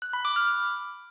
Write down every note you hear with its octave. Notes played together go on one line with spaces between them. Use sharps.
F#6
B5
D6
F6